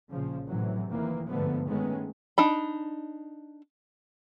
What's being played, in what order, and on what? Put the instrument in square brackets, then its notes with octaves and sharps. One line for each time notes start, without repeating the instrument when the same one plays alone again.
[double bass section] A#1 C#3 F3
A2 C3 E3 F#3
F1 D#3 E3 A#3
G1 G#2 D3 F3 A3 B3
D#3 G#3 A3 B3 C#4
[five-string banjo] D4 D#4 B5